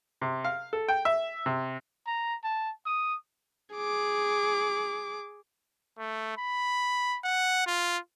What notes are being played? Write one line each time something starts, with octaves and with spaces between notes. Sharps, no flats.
C3
F5
A4
G5
E5
C3
A#5
A5
D#6
G#4 D6
A3
B5
F#5
F4